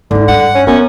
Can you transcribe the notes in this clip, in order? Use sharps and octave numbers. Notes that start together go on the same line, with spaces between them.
G#2 D3 E4
G2 F#5
C#4
F#2 B3 C#4